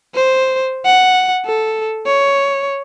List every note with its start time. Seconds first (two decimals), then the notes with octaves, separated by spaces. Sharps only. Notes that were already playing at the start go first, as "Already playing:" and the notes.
0.15 C5
0.85 F#5
1.46 A4
2.06 C#5